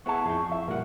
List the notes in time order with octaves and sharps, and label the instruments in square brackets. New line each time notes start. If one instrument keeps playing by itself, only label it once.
[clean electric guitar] B3 G#4 A5 [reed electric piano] E4 F#5 [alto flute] C#6
[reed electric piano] F2 E4 G6 [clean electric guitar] G#4
[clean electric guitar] E5
[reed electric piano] A#2 G3 F#5 [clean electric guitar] A#4